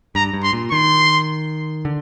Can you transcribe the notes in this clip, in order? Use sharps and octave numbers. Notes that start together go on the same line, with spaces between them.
G2 A#5
G2
C6
A#2
D#3 C6
D3